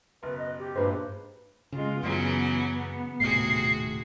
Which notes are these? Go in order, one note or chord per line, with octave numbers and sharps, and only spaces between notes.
F#1 B2 B4
D#5
G4
G2 A#2 F#3 G#3 B4 C5
C#3 G#3 F4
F#2 C#3 E3 F#3 B3
D#1 A2 C3 F#4 G#4 C7